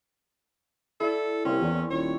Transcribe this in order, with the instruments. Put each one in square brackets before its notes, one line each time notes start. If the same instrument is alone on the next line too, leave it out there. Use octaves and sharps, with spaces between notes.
[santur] E4 D5 [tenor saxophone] A4
[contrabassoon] C2 [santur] A#3 C4 [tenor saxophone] C#4
[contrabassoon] E2 [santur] D5
[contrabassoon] D#1 [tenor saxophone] C#5